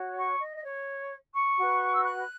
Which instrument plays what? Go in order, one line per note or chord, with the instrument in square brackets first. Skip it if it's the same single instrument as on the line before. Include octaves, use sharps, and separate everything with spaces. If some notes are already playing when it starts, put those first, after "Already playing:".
Already playing: [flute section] F#4 C#5
C#6
D#5
D#5
C#5
C#6
F#4 B4
E6
F#6